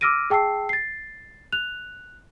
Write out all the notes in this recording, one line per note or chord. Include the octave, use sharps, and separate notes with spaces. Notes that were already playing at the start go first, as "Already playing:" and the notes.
D6 E6 F6 A#6 D7 D#7
G#4 G5 A5 E6 C7
A6 C7
F#6 F7